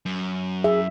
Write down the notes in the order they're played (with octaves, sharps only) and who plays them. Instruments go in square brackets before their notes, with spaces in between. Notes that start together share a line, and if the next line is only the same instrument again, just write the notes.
[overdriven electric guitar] F#2
[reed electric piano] G#4 [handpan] E5